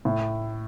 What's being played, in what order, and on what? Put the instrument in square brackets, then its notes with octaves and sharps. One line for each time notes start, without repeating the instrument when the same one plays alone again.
[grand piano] A2